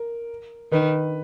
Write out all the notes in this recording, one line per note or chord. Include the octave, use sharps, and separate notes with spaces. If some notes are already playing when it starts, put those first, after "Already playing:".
Already playing: A#4
D#3 B4